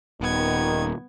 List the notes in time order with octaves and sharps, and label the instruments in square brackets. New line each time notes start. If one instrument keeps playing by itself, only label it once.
[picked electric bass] D#1 [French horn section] D#3 [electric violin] B3 G#6